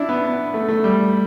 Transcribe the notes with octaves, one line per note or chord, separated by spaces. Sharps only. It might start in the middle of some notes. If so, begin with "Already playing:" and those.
Already playing: D4 E4
B3
B3
A3
A3
G3